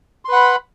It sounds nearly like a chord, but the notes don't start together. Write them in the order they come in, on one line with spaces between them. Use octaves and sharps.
C6 B4 F#5 B5